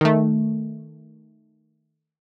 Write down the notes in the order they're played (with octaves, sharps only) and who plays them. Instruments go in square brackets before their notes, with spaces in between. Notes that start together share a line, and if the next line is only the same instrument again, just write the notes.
[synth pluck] D#3 A3